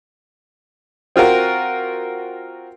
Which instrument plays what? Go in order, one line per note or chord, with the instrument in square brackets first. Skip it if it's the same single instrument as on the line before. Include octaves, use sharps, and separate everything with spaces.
[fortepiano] C4 F4 F#4 A#4